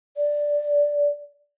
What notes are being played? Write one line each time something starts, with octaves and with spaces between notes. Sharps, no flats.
D5